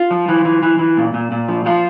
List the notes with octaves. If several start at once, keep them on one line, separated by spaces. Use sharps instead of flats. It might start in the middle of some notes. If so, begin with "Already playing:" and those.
Already playing: F4
F3
E3
E3
E3
E3
A#2
A#2
A#2
F3
F3 F4